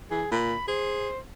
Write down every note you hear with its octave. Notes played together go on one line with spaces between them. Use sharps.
E3 G#4
A#2 B5
G#4 C5